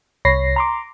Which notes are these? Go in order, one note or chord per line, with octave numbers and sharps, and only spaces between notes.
C2 C#5 B5 A#6 C7
A#5 C6 D6